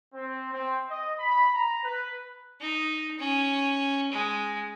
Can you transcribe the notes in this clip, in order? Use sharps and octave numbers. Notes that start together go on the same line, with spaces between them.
C4
C4
D#5
B5
A#5
B4
D#4
C#4
G#3